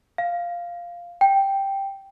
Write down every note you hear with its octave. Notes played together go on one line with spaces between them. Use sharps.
F5
G5